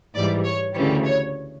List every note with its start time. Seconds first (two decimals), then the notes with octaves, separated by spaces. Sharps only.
0.15 G#2 E3 G3 D5
0.44 C#5
0.74 D2 C#3 E3 G3 C#5
1.04 C#5